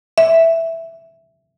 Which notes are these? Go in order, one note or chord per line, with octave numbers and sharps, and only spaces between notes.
E5